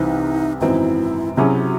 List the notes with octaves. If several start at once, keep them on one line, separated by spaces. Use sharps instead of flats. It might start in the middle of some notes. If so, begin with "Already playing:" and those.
Already playing: C2 C3 E3 C4 D#4
G#1 F#2 E3 C4 D#4 E4
C3 F#3 C#4 E4 F#4 G#4